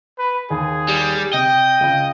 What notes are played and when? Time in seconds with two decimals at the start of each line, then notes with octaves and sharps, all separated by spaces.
0.18 B4
0.50 D#2 G#4
0.88 G3
1.33 C3 D#5 G5
1.80 C#2 C#3